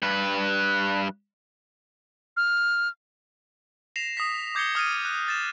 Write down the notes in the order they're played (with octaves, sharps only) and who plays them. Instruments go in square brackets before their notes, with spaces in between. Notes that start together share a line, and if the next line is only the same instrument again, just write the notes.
[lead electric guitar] G2 B4
[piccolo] F6
[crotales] A#6 C7 E7 F7
D#6 A#6 B6
D6 G6 G#6 C7 C#7 G7
D#6 F6 G#6 A6 D#7
F#6
A6 E7